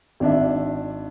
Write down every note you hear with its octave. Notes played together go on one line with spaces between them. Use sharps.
G#1 D4 E5